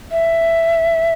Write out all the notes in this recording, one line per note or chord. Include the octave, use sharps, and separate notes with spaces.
E5